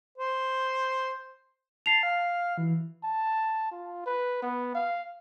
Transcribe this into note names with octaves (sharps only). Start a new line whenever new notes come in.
C5
A5 C7 F7
F5
E3
A5
F4
B4
B3
F5